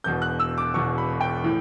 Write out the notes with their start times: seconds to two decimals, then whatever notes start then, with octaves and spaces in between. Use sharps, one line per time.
0.04 E1 E2 B2 G6
0.22 F#6
0.40 E6
0.58 D6
0.74 E1 E2 B2 C#6
0.98 B5
1.21 G5
1.44 A2 E3